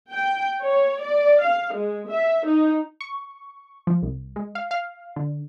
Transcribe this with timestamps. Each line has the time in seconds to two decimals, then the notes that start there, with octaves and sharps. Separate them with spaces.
0.11 G5
0.62 C#5
1.01 D5
1.41 F5
1.75 G#3
2.11 E5
2.46 D#4
3.01 C#6
3.87 F3
4.03 C2
4.36 G#3
4.55 F5
4.71 F5
5.16 D3